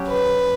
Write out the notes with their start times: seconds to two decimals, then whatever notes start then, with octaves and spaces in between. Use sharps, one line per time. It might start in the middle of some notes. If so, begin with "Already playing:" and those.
Already playing: F#3 C#4 G4
0.08 B4